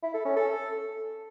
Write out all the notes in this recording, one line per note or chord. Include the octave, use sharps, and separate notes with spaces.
E4
A4
C#4
A4